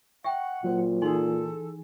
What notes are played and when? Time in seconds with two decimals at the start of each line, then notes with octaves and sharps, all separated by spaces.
0.24 E5 F#5 G5 C#6
0.64 A#2 F#3 C5
1.02 E3 D#4 G#4 A4 C6